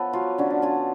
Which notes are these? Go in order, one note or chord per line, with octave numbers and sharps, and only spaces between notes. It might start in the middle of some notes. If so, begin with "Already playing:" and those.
Already playing: F3 B3 A4 B4 C#5
F#3 F4
D3 C#4
D4
C#4 F4